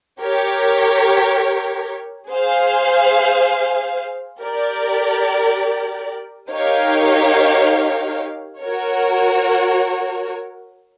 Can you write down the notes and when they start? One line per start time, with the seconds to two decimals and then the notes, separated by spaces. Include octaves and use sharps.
0.22 G4 A#4 C#5
2.32 G#4 C5 F5
4.42 G4 A#4 D5
6.52 D#4 G4 A#4 C#5 F5
8.62 F#4 A#4 C#5